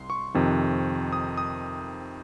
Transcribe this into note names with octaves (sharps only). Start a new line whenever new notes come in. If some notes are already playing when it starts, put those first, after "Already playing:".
Already playing: C2 C6
C#6
F2 C3 D#3
D#6
D#6